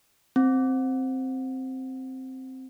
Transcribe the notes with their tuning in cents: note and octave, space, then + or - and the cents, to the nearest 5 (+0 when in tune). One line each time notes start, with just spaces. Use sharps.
C4 +0